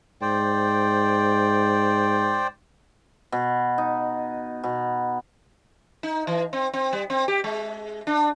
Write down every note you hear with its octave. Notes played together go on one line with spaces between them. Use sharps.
G#2 C5 D5 G5
B2
D#4
B2
D#4
E3
C4
C4
G3
C4
G4
G#3
D4